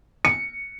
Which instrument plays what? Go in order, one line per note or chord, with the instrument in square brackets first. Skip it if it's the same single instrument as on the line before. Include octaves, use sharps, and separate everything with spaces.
[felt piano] C#7